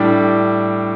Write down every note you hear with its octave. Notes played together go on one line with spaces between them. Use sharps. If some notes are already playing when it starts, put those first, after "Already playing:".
Already playing: A2 G3 D4